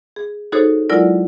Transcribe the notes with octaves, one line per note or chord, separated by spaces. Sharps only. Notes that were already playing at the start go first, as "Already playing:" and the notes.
G#4
D#4 F#4 G#4 A4 C5 C#5
F#3 G#3 E4 F4 A#4 D5